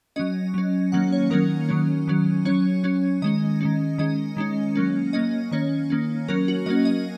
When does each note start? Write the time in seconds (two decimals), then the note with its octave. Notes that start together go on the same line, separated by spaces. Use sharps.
0.16 F#3 C#4 D#5
0.54 F#3 C#4
0.92 D#3 F#3 A#3 C#4 F#5
1.12 C#5
1.30 D#3 F#3 A#3 C#4 A#4
1.69 D#3 F#3 C#4
2.08 D#3 F#3 C#4
2.45 F#3 C#4 C#5
2.84 F#3 C#4
3.22 D#3 G#3 C#4 D#5
3.61 D#3 G#3 C#4
3.98 D#3 G#3 C#4 D#5
4.37 D#3 G#3 C#4
4.75 F#3 A#3 C#4
5.13 F#3 A#3 C#4 D#5
5.51 D#3 A#3 C#4 C#5
5.90 D#3 A#3 C#4
6.28 F#3 A#3 C#4 A#4
6.48 F#4
6.66 F#3 A#3 C#4 D#5
6.85 D#5